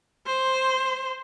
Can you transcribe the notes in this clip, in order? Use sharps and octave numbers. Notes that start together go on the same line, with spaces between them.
C5